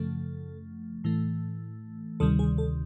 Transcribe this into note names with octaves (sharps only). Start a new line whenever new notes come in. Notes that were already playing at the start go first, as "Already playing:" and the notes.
Already playing: F#2 C#3 F3 A3 A4
A2 E3 A3
D2 C3 D#3 G3 A4
G#4
A4